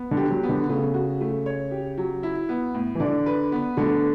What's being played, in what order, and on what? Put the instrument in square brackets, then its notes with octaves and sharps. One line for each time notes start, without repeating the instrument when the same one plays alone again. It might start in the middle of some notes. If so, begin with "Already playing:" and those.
Already playing: [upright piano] B3
[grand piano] D3
[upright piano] G4
[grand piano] F#3
[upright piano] B3
[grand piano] D3
[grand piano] C#3 [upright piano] A3
[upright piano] F#4
A3
C#5
G4
F#3
E4
B3
A2
[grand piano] E3
[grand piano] D3 [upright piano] D5
[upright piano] B4
B3
[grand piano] D3 [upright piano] A3